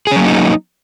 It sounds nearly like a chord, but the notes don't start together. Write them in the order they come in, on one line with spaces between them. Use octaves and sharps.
G#4 C#4 F#3 A#3 D#4